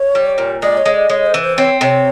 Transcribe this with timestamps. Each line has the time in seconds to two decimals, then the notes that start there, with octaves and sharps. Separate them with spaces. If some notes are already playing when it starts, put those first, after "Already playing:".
Already playing: C#5
0.15 G3
0.38 A#2
0.62 G#3 D5
0.77 C#5
0.85 G#3
0.94 D5
1.10 G#3 C#5
1.26 C5
1.34 E3
1.42 C5
1.58 C4 C#5
1.81 C3 C#5